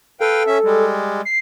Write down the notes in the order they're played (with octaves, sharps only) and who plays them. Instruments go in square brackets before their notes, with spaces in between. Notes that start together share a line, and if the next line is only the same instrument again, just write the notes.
[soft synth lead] A4 [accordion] B4 F5 G5
[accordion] C#4 E5
G3 G#3
[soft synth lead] C7